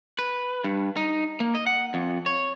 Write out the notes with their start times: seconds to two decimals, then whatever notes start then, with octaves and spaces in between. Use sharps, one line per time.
0.19 B4
0.64 G2
0.97 D#4
1.40 A#3
1.55 D#5
1.67 F#5
1.94 F2
2.26 C#5